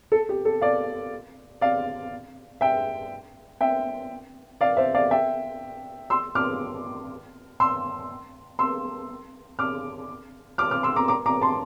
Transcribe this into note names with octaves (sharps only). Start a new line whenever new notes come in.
A4
G4
A4
D5 F5
D5 F5
E5 G5
E5 G5
D5 F5
C5 E5
D5 F5
E5 G5
C6 E6
D6 F6
C6 E6
C6 E6
D6 F6
D6 F6
D6 F6
C6 E6
A#5 D6
A#5 D6
A#5 D6
A5 C6